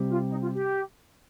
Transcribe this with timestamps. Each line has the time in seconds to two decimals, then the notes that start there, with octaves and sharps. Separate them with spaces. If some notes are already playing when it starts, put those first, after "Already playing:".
Already playing: C3 G3 C4 G4
0.09 F4
0.28 D#4
0.41 F4
0.54 G4